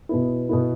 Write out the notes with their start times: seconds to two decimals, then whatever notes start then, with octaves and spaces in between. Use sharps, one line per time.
0.09 B2 B3 E4
0.49 B2 B3 E4